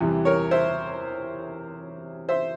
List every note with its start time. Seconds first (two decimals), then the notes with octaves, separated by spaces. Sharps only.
0.01 E2 C3 E3 G3
0.25 A#4 C#5
0.51 C5 E5
2.29 C5 E5